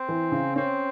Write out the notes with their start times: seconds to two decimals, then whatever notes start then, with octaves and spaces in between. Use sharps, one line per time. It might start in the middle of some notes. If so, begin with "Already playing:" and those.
Already playing: C4
0.09 E3
0.32 C#3
0.56 C4 C#4